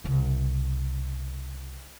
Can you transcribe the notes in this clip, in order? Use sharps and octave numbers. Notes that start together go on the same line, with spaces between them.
C2 C#3